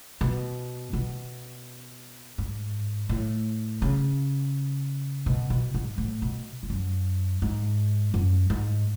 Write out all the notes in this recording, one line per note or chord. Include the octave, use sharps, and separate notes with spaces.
B2
B2
G#2
A2
C#3
B2
B2
G#2
A2
B2
G#2
F#2
G#2
F#2
G#2